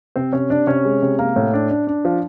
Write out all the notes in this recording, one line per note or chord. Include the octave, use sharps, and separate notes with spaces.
C3 C4 C5
C3 C#4 C#5
C3 D4 D5
C3 C#4 C#5
G#3
C3
A#3
A2
D4
D4
D4
F3